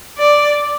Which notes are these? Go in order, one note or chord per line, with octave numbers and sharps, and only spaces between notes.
D5